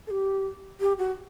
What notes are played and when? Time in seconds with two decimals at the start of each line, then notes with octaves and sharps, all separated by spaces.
0.07 A4
0.11 G4
0.80 G4
0.99 F#4